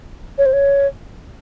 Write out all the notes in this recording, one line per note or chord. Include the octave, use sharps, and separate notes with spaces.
C#5
C5
C#5